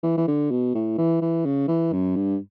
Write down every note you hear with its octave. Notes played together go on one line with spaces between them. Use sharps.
E3
E3
D3
B2
A2
E3
E3
C#3
E3
F#2
G2